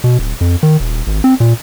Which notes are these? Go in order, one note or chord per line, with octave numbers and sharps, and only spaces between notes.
B2
D1
F2
D#3
D#1
G#1
C4
A#2